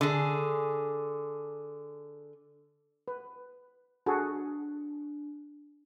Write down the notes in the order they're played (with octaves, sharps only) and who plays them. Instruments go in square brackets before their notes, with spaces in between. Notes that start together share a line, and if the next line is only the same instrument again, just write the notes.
[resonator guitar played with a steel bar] D3 G#4
[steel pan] B4
[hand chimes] D4 [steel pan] F#4 G#4 A4